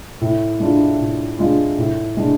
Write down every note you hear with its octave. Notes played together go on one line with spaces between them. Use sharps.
A2
G#3 D4 F4
A2
G#3 D4 F4
A2
G#3 D4